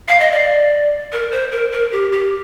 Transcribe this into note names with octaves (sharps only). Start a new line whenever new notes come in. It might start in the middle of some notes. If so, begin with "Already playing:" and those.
F5
D#5
D5
A#4
C5
A#4
A#4
G4
G4